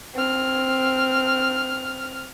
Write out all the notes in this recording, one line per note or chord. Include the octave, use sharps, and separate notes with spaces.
C4 F6